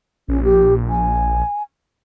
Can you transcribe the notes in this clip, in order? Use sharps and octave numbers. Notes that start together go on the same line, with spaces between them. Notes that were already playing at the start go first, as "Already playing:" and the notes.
A#1 C#4
G4
G#5